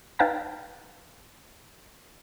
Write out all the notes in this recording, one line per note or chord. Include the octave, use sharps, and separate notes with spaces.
D#4 B4 F5 G5 A5 A#5